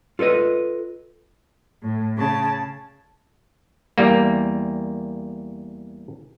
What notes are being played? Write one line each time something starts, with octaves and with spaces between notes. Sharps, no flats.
F4 A4 B4 D#5
A2
C#3 A5
E2 G3 A#3